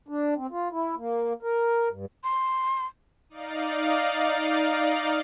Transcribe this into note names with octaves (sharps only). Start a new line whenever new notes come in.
D4
C4
F4
E4
A#3
A#4
G2
C6
D#4 D5 F5